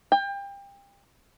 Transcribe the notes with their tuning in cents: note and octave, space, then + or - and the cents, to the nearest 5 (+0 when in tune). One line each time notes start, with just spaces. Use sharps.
G5 +30